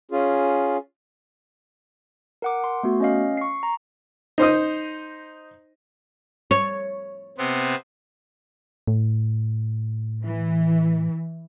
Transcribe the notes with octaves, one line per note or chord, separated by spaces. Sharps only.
C#4 F4 G#4
A#4 F#5 D6
C6
A3 B3 F#4
C#4 D#5 F5
C#6 C7
A#5
D#4 C5 D#5 D#6
C#5
C3 B3 C4
A2
E3